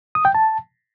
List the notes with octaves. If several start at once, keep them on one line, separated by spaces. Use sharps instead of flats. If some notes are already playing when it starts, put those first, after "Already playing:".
D#6
G5
A5